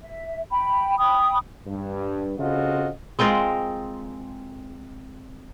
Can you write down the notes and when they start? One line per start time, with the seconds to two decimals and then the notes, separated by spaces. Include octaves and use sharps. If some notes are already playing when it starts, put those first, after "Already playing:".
0.02 E5
0.51 G5 B5
0.99 G5 B5 D#6
1.65 G2
2.39 C#3 C4 F4 F#4 A4 D#5
3.19 G#3 C4 F4 A#4